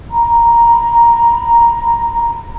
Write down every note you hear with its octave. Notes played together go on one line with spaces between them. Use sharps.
A#5 B5